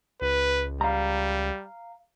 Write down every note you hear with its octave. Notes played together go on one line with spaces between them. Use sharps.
C#2 B4
G3 F5 A#5